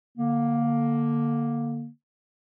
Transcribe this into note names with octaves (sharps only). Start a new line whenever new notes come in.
D3 A#3